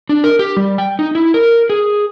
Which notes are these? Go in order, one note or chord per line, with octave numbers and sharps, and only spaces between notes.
D4
A#4
G4
G3
G5
D#4
E4
A#4
G#4